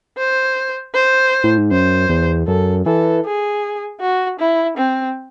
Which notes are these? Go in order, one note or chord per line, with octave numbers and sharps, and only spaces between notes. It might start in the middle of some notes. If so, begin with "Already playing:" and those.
C5
C5
A2
G#2
F#2 C5
E2
F#2 A4
E3 A4
G#4
F#4
E4
C4